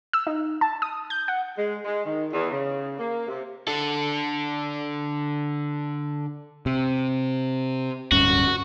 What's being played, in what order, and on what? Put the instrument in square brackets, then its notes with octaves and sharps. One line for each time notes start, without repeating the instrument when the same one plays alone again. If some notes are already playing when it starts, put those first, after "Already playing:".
[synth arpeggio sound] E6
D#4
A5
D#6
G6
F#5
[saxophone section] G#3
G#3
D#3
E2
C#3
A#3
C3
[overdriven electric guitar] D3 A4
[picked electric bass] C3
[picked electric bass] D1 G2 C#4 [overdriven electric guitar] F#4